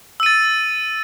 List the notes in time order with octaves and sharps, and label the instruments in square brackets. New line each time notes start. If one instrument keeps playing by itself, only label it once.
[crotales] E6
D#7
A6